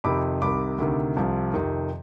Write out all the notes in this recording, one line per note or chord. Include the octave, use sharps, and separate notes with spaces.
F2 C3 D#3 B5 D6
C2 C3 D#3 B5 D6
D2 C3 D#3
C2 C3 F3
F2 C3 D#3